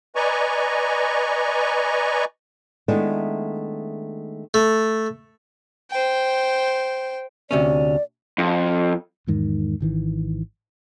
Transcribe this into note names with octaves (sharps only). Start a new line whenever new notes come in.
B4 D5 D#5 G#5 A#5 C#6
D#3 G#3 A3 B3 D4 E4
A3
C5 G5
D2 C3 C#4 D5
F2
E2 G#2 D#3
G#1 D#3 E3